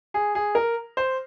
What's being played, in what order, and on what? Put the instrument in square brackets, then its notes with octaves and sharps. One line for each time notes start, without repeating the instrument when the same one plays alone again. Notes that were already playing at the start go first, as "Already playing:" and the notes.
[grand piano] G#4
G#4
A#4
C5